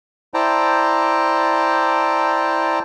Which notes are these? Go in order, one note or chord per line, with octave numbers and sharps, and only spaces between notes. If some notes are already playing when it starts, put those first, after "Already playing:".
E4 C5 D5 G5 A5 A#5